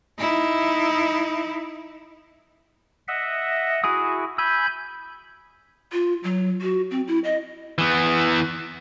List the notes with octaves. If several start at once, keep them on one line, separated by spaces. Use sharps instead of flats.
D#4 E4
D#5 E5 F#5
E4 F#4 G#4 D#6
G#5 B5 E6 G6
F4
F#3
F#4
C4
E4
D#5
E3 B3